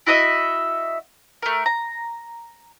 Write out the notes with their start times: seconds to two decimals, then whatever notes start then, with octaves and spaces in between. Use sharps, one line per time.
0.07 E4 F#4 D#5 E5
1.42 A3 A#4
1.66 A#5